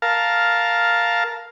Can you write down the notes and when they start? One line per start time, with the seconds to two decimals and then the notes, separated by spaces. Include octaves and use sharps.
0.02 A#4 F5 A5